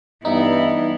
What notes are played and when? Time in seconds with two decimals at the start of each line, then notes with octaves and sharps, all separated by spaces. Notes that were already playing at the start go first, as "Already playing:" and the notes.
0.25 G2 E3 B3 D#4 E4 E5